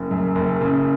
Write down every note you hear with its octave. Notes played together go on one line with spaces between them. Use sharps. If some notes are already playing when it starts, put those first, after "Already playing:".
Already playing: F#1 C#3
F#2
F#1
C#3